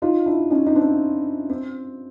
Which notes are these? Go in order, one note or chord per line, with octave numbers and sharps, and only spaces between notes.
D#4 F4
D4 E4
C#4 D#4
D#4
C4 D4
C4